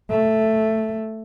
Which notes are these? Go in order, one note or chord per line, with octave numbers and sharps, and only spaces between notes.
A3